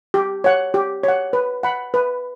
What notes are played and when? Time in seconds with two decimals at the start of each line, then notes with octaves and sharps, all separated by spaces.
0.14 G4
0.44 C#5 F#5
0.74 G4
1.03 C#5 F#5
1.33 B4
1.63 F#5 B5
1.94 B4